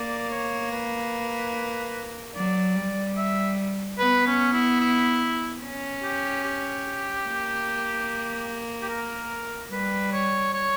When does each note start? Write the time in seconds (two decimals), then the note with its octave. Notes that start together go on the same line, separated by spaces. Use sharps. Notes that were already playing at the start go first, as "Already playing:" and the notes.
Already playing: A#3 D5
0.31 C#5
0.71 B4
2.35 F#3 D5
2.76 G3
3.17 E5
3.99 B3 B4
4.27 C#4
4.53 E4
4.80 E4
5.62 C#4
6.03 G4
6.44 G4
7.26 A#3
8.82 G4
8.89 A#4
9.71 G3 B4
10.12 C#5
10.53 C#5